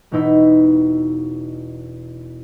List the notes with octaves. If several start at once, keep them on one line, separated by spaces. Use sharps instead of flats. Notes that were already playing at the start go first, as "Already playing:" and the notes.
E1 B2 D#4 E4 B5